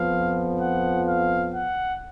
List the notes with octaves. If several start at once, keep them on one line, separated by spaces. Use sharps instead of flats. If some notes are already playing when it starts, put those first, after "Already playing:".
Already playing: F2 F3 B3 F5
F#5
F5
F#5